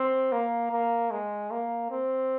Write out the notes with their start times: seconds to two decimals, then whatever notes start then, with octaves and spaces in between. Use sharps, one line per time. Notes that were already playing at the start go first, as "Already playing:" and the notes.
Already playing: C4
0.33 A#3
0.72 A#3
1.11 G#3
1.51 A#3
1.91 C4